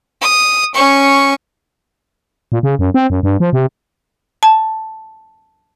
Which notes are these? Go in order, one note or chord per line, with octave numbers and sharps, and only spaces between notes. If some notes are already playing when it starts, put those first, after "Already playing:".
D#6
C#4 C#6
A#2
C#3
F#2
C4
F#2
G2
F3
C3
A5